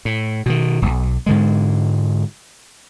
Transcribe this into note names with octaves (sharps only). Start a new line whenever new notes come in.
A2
B2 D3 D#3
D1 B1
G#2 D3 G#3